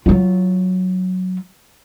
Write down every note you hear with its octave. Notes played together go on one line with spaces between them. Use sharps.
F#3 F4